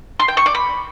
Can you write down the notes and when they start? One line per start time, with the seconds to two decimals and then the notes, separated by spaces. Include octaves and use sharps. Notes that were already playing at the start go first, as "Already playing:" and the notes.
0.20 C6
0.28 G5
0.37 C#6
0.46 D5
0.55 B5